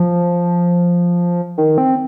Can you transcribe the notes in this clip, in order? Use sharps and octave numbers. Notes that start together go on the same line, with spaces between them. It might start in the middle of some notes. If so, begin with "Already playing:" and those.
Already playing: F3
D#3
C4